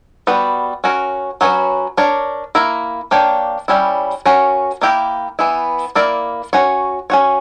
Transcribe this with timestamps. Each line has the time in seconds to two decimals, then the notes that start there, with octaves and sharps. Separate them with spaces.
0.27 G3 B3 F#4 B4
0.84 C#4 F#4 A#4
1.41 F#3 C#4 F#4 B4
1.97 D4 A#4 C#5
2.55 A#3 E4 A#4
3.11 A#3 D4 G4 C#5
3.68 G3 C#4 E4
4.26 C#4 F#4 A#4 C#5
4.82 A#3 E4 G4 A#4
5.39 E3 B3 E4
5.95 A#3 E4 A#4 D5
6.53 C#4 F#4 C#5
7.10 C#4 F#4 C#5